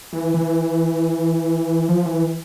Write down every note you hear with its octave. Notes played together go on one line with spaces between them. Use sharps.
E3
E3
F3
E3